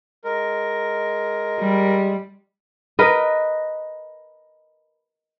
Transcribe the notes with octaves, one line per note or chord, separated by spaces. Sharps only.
G#3 A#4
G3
A#4 B4 D#5